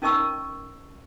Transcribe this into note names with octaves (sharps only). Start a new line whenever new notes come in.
C#4 D#4 A#4 D#5 C#6 E6